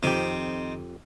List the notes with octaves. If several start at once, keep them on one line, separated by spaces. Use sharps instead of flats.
F2 D#3 C4 G4